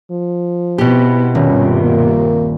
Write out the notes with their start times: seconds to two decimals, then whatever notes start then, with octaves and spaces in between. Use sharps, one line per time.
0.11 F3
0.78 B2 B3 C4 E4 G4
1.35 D#1 G2 C3 C#4
1.83 A#3